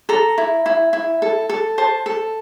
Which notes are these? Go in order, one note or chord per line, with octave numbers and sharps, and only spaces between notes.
A4 A#5
E4
E4
E4
A4
A4
C5 A5
A4